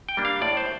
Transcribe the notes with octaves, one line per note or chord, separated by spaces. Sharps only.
G5
G3 A#3 D4
F5
A2 D5
C5